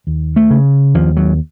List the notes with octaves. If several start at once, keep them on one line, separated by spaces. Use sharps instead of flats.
D#2
A3
C#3
D#2 F3
F#3